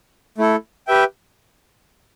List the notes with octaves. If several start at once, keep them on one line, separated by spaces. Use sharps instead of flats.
A3 E4 A4
G4 B4 E5 G5